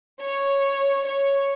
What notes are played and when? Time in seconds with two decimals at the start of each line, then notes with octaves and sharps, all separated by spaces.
0.21 C#5
1.07 C#5